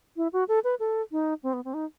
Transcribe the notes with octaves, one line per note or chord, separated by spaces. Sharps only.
E4
F#4
A4
B4
A4
D#4
C4
B3
C4
D#4